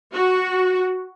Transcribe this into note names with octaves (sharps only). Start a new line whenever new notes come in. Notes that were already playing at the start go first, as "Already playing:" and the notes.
F#4